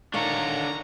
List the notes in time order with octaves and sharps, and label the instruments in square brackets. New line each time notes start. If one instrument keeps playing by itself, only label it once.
[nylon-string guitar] A#2 D#3 A#3 [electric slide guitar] D4 A4 C#5 [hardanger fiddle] A#5 C#6